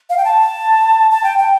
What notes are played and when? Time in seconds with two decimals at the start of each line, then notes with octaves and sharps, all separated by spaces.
0.10 F5
0.17 G5
0.25 A5
1.11 A5
1.24 G5
1.38 G5